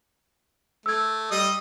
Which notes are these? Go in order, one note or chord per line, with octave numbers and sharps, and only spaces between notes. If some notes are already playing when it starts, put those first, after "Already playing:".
A3 E6 G#6
G3 D#5 D#6